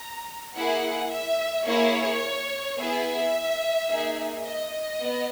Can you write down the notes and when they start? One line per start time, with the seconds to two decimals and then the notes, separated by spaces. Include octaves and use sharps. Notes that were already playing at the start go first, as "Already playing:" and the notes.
Already playing: A#5
0.56 A#3 E4 G#4 F#5
1.11 E5
1.67 A#3 E4 G#4 C#5
2.78 B3 E4 G#4 E5
3.89 A#3 D#4 G#4
4.45 D#5
5.01 B3